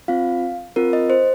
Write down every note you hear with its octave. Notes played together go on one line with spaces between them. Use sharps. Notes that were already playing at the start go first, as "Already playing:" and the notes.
C4 F4 F5
C4 F4 A#4
D#5
C5